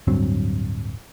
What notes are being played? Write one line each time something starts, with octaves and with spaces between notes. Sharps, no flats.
D1 G2 F#3 C4